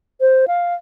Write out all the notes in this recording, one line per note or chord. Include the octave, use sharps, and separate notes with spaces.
C5
F5